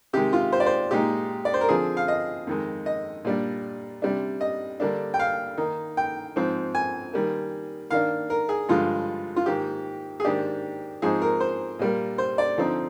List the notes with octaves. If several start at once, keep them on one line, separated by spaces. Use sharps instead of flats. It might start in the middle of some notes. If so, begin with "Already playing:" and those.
C3 D#3 G#3 G4
F4
C5
D5
C5
A#2 G#3 D#4 G4
D5
C5
A#4
D3 F3 C4 G#4
F5
D#5
F2 D#3 G#3
D#5
A#2 G3 D4
C3 G3 D4
D#5
D3 G3 A#3 D4
G5
F5
D#3 A#3 D#4
G5
G#2 F3 C4
G#5
D#3 G3 A#3
D#3 A#3 D4 F5
A#4
G#4
G2 D3 F3 G#3 F4
F4
G#2 D#3 A#3 G4
G#4
G#2 D#3 A#3 D4 G4
G#2 F3 C4 D#4 G#4
A#4
C5
A#2 G3 A#3
C5
D5
D3 F3 C4 D#4